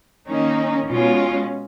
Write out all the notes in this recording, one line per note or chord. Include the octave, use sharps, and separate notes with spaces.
D#3 A#3 C#4 D#4
B2 G#3 C#4 F4